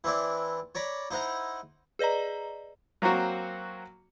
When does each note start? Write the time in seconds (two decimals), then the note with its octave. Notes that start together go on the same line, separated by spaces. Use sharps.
0.04 E3 C4 D4 E4
0.75 C#5 D5 A#5 B5
1.11 D#4 E4 C5 F#5 A#5
1.99 G#4 B4 D5 D#5 A#5
3.02 F#3 A#3 C4 F#4